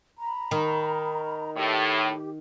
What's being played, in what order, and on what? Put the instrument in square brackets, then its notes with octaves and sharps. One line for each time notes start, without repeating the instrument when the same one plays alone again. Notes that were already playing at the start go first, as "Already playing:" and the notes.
[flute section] A#5 B5
[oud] D#3
[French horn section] A2 [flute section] G4